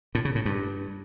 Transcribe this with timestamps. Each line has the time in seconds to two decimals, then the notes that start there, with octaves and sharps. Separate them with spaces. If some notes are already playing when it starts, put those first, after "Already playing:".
0.15 A2
0.25 C#3
0.35 A2
0.45 G2